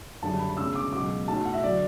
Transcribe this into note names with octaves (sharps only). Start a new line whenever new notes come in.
F#1 F#2 D3 G3 A5
B5
E1 D2 C#3 E6
D6
C#2 B2 F#3 D6
B1 A2 F#3 A5
F#5
E5
D3 F#3 D5